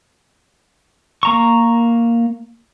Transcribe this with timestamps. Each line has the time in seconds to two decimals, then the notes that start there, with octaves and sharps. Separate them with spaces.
1.23 A#3 A#5 C#6